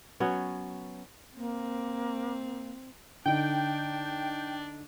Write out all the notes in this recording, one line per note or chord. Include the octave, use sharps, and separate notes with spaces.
F#3 B3 C#4
A#3 C4
D3 D4 D#4 G5